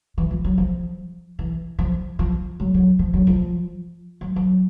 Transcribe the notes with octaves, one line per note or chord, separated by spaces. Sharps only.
E3
F3
F#3
F3
E3
F3
F3
F#3
F#3
F3
F#3
F3
F#3
F#3